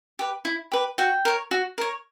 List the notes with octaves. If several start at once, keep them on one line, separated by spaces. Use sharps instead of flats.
G4 B4
E4
G4 B4
F#4 G5
A#4 C#5
F#4
A#4 C#5